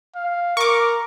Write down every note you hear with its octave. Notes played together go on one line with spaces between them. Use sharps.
F5
A#4 C#6 D6